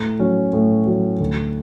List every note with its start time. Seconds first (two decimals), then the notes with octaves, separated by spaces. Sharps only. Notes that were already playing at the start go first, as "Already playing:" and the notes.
Already playing: A2
0.19 F#3 C#4
0.53 A2
0.86 F#3 C#4
1.20 D2